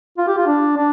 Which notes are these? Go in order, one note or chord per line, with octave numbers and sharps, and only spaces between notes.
F4
G4
F4
D4
D4